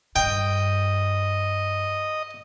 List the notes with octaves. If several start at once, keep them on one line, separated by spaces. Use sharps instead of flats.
G2 D#5 G5